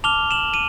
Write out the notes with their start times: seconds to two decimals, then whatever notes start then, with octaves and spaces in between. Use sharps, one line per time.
0.04 A5 D6 F6 F7 G7
0.31 E7 F#7
0.54 D#7